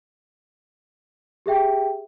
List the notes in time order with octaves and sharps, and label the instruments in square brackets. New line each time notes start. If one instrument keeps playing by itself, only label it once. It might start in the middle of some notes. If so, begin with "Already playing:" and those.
[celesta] G4 G#4 E5 G5